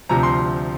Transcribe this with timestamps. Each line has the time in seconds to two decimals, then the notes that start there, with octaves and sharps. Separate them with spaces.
0.09 D2 C3 F3 A#5
0.23 C6